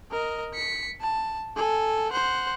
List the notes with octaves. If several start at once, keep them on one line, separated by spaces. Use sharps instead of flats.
A#4 D#5
B6 C#7
A5
A4 G#5
C5 F#5